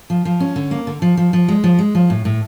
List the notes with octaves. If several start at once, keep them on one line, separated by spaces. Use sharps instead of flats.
F3
F3
C#4
D3
A#3
D3
F3
F3
F3
G#3
F3
G#3
F3
A2
A2